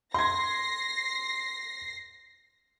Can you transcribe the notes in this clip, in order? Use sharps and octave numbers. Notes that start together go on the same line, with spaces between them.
C6 G#6 A#6 C7